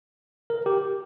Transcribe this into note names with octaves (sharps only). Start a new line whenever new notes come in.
A#4
G4